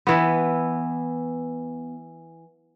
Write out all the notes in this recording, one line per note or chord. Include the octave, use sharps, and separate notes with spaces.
E3 B3